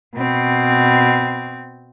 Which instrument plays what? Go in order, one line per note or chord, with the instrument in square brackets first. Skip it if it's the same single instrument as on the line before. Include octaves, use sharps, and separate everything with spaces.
[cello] B2 C4